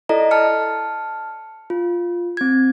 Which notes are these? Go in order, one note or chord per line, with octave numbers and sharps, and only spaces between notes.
E4 A4 D5 D#5 A#5
A5 F6 C#7
F4
C4 G#6